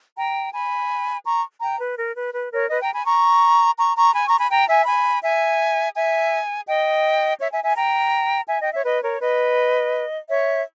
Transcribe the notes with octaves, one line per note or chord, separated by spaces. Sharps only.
G5 A#5
G#5 B5
A#5 C#6
G5 A#5
B4
A#4
B4
B4
A#4 C#5
B4 D#5
G5 A#5
G#5 B5
A#5 C#6
A#5 C#6
A#5 C#6
G#5 B5
A#5 C#6
G#5 B5
G5 A#5
E5 G#5
G#5 B5
E5 G#5
E5 G#5
D#5 G5
C#5 E5
E5 G#5
E5 G#5
G5 A#5
E5 G#5
D#5 G5
C#5 E5
B4 D#5
A#4 C#5
B4 D#5
C#5 E5